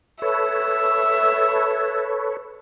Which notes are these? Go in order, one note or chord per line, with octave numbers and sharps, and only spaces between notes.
A4 B4 C#5 E5